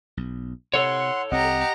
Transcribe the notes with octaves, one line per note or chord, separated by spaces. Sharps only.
B1
C3 A4 C#5 F#5 C6
C2 C4 G4 D#5 F#5 A#5